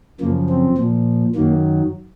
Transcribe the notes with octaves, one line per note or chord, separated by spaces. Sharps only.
F#2 C#3 F3 A#3
C4
A#2 F3
F#2 D#3 F#3 A#3